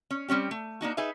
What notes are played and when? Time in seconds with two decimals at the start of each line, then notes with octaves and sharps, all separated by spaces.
0.11 C#4
0.28 G3 C4 C#4 G4
0.51 A3
0.81 A#3 D4 D#4 F#4
0.97 D#4 G#4 B4 E5